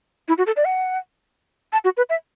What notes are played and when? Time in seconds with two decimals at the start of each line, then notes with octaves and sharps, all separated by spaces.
0.28 E4
0.38 F#4
0.46 A4
0.56 D5
0.65 F#5
1.73 A5
1.84 F#4
1.97 B4
2.09 E5